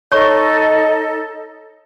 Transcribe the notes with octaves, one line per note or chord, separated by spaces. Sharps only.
D#4 A4 C#5 D#5 C#6